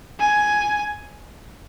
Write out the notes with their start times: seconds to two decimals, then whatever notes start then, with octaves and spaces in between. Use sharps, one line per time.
0.20 G#5